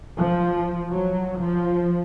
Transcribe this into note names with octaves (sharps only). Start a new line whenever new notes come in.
F3
F#3
F3